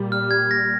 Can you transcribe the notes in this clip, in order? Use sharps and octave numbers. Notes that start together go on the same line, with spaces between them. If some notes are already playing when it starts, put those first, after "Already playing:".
Already playing: A#2 G3 A#3
F6
G#6
A#6